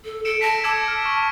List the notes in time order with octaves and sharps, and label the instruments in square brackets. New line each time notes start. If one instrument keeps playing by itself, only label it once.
[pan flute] A4
[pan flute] A4 [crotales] C#7 D7 E7
[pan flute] A5 [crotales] A#6 B6
[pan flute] A5 [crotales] D6 E6 G#6
[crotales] F6
C#6